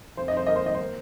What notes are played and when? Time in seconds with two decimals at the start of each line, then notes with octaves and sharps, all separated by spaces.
0.17 F1 C5
0.28 D#5
0.34 F1 C5
0.47 A#3 D#5
0.56 C5
0.63 D#3 D#5
0.75 A#3 C5